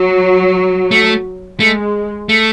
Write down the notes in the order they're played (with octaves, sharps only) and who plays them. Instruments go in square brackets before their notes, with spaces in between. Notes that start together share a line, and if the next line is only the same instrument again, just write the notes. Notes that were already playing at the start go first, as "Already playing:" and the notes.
Already playing: [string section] F#3
[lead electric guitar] A3
[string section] G#3 [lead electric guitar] A3
[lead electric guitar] A3